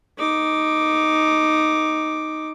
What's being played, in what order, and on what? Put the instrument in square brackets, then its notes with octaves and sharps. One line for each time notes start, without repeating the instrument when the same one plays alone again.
[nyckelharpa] D#4 D6